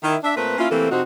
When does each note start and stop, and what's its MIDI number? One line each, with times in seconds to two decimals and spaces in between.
0.04 0.16 51
0.04 0.16 64
0.24 0.34 62
0.24 0.34 76
0.36 0.57 46
0.36 0.57 57
0.36 0.57 60
0.36 0.57 70
0.36 0.57 71
0.58 0.70 58
0.58 0.70 61
0.58 0.70 64
0.58 0.70 65
0.71 0.90 48
0.71 0.90 52
0.71 0.90 57
0.71 0.90 58
0.71 0.90 60
0.71 0.90 69
0.91 1.02 41
0.91 1.02 48
0.91 1.02 60
0.91 1.02 63
0.91 1.02 66